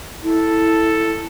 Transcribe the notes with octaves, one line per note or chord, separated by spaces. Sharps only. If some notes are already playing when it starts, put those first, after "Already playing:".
E4 A4